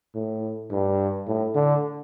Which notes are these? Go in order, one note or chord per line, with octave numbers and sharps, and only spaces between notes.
A2
G2
A2
D3